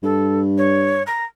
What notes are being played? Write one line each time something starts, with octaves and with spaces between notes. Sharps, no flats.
G2 A4
C#5
A#5